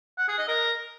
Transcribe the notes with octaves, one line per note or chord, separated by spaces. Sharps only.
F#5
G#4
D#5
A#4